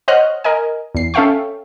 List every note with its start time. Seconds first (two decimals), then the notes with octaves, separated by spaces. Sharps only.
0.08 C5 C#5 D#5 F#5 F6 F#6
0.44 A#4 D#5 G#5
0.95 E2 C7
1.14 C#4 A4 E5 F5 G5 C#6